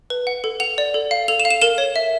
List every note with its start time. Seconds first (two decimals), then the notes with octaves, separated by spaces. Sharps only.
0.10 B4
0.27 F#5
0.44 A4
0.60 F#5 F7
0.78 D5
0.94 A4
1.11 F5
1.28 A4 F7
1.40 E7
1.45 F5
1.51 E7
1.62 A#4 E7
1.78 C#5
1.96 E5